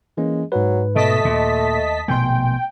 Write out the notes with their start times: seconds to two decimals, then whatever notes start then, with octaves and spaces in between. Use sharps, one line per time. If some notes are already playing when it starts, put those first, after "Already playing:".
0.17 E3 G#3 A#3 C#4
0.52 G#2 F#3 B4
0.96 B2 A3 D#5 A5 B6
1.25 D#2 A#2
2.08 A#1 B2 A3 G5 G#5 C6